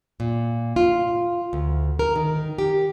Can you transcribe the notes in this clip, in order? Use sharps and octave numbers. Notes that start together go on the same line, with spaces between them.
A#2
F4
D2
A#4
D#3
G4